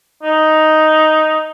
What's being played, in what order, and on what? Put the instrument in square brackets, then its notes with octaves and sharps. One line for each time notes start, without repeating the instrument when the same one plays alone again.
[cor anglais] D#4